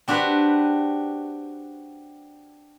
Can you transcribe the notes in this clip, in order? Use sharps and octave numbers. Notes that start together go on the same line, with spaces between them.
C4 D4 F#4 G4 B4